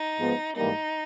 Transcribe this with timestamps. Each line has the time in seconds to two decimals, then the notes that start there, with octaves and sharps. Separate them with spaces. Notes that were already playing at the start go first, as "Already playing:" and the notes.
Already playing: D#4
0.19 G#2 F3 G#3 B3
0.57 G#2 E3 G3 A#3 D#4